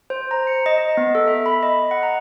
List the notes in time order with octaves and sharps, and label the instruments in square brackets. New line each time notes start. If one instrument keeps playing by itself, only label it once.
[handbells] C5
A#5
C#7
D#5
D#5
B3
A4
E5
B5
D#5
F#5
A#5